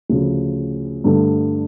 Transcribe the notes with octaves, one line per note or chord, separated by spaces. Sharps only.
D2 C#3 F3
G2 D3 A3 D4